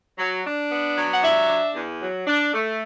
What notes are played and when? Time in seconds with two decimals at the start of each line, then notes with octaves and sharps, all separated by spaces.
0.19 F#3
0.45 D4
0.71 B3
0.97 F#3
1.14 F#5
1.23 D4 E5
1.49 D4
1.75 E2
2.01 F#3
2.27 D4
2.53 A3